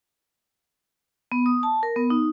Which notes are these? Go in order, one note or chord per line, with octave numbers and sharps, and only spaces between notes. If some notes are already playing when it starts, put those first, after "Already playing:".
B3
D#6
A5
A#4
B3
D#4